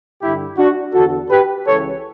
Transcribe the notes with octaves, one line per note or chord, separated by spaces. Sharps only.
G2 D3 E4 G4
D4 F#4
E2 D3 F#4 A4
G4 B4
C#2 C#3 E3 A4 C#5